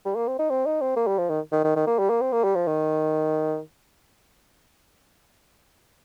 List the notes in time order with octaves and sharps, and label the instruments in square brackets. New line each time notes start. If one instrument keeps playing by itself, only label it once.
[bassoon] G3
A#3
C4
D#4
C4
D#4
C4
A#3
G3
F3
D#3
D#3
D#3
D#3
A#3
G3
A#3
C4
A#3
G3
F3
D#3